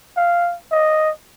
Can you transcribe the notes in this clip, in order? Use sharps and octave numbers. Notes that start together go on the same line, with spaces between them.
F5
D#5